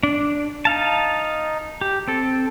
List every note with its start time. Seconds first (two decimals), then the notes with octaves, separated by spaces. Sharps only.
0.03 D4
0.65 D#4 F5 A5
1.81 G4
2.08 C4 A4